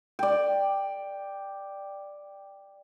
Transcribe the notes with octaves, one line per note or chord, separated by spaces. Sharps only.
D5 G5